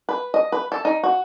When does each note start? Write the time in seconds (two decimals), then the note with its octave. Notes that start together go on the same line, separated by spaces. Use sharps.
0.09 B4
0.34 D#5
0.52 B4
0.72 A4
0.85 D#4
1.03 F#4